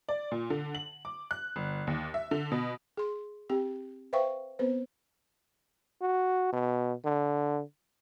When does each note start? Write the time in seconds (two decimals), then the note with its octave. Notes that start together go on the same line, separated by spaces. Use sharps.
0.09 D5
0.31 A#2
0.50 D3
0.75 F#7
1.05 D6
1.31 F#6
1.56 G1
1.87 D#2
2.14 E5
2.31 D3
2.52 B2
2.97 G#4 C6
3.49 C4 G4 G5
4.13 B4 C5 E5 F5 G5 C#6
4.59 B3 C4 B4 C5
6.02 F#4
6.52 B2
7.04 D3